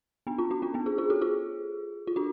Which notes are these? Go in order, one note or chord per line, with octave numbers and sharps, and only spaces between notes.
B3 D4
C#4 F4
D4 F#4
C#4 F4
B3 D4
F4 G#4
F4 G#4
F#4 A4
F4 G#4
F4
D4 F#4